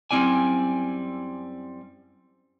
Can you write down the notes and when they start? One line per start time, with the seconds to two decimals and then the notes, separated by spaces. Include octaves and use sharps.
0.11 F#2 G3 C4 E4 D5 G#5